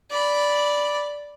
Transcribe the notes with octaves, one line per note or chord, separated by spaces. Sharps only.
D5 B5